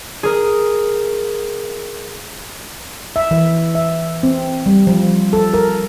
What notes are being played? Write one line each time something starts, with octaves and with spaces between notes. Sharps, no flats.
G#4 A#4
E5
E3
E5
C4
G3
F3
A4
A#4